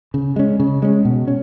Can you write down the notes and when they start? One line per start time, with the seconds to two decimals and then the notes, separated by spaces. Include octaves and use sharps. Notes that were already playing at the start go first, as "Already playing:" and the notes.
0.14 C#3
0.36 G#3 C#4
0.60 C#3
0.82 G#3 C#4
1.05 B2
1.28 C#4